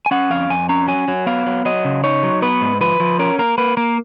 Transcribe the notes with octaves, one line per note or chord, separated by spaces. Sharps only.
G#5
C#4 F#5
F2 F5
F2 G#5
C#4 A#5
F#3 G#5
F#3
B3 F5
F#3
F#3 D#5
C#3
D#4 C#5
F#3
B3 B4
G#2
F3 B4
F3
C#4 A#4
A#3 A#4
A#3 B4
A#3 A#4